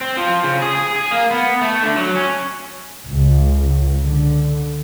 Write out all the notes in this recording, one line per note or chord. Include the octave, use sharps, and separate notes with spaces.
C4
F3
C#3
G#4
G#4
G#4
A#3
B3
A3
D3
F#3
C#4
C#2
D3